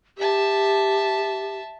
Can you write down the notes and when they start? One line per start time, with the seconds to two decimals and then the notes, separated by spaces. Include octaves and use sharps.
0.18 G4 E5 A5